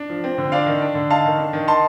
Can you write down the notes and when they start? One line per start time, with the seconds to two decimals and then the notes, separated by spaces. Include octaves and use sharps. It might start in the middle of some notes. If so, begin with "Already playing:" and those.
Already playing: D4
0.10 F3
0.24 C4
0.38 D3
0.52 D4 D5 F5
0.66 D#3
0.82 D4
0.95 D3
1.10 D#4 F5 A5
1.25 D#3
1.38 D4
1.53 D#3
1.68 D#4 A5 C6